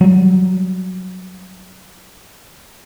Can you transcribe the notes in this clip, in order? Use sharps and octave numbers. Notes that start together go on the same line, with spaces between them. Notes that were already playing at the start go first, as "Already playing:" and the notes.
F#3 G3